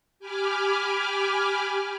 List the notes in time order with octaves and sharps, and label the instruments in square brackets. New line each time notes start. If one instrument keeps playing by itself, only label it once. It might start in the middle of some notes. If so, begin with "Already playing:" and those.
[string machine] G4 G#5 B5 D6 F6